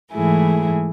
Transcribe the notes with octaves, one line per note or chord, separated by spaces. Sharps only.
G#2 E3 A3 E4 G#4